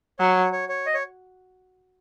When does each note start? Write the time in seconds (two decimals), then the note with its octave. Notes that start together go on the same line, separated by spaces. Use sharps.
0.19 F#3 C#5
0.52 C#5
0.69 C#5
0.86 D#5
0.94 C#5